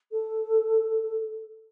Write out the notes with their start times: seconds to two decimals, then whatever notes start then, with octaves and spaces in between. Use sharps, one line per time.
0.12 A4